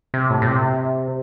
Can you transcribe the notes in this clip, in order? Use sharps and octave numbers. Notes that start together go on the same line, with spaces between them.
C3
A2
A2
C3